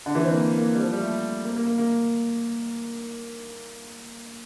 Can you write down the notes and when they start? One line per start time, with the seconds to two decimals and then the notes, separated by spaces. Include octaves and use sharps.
0.06 D3
0.15 E3
0.24 C4
0.32 A#3
0.58 A#3
0.75 G3
0.83 F3
0.93 G3
1.01 A3
1.44 A#3
1.56 A#3
1.67 A#3
1.78 A#3